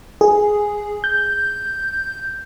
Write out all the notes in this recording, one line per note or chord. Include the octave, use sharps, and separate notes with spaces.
G#4
G6